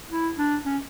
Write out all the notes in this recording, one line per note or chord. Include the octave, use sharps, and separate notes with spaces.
E4
D4
C#4